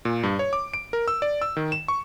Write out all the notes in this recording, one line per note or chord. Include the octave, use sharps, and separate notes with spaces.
A#2
G2
C#5
D6
D7
A#4
E6
D5
E6
D#3
E7
C#6